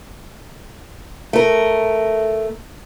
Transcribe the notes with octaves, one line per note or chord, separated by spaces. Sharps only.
A3 A#4